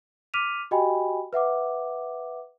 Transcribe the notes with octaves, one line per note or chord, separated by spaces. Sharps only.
D6 F6 B6 D#7 F7
F#4 G4 D#5 G5 G#5 B5
B4 E5 F#5 D6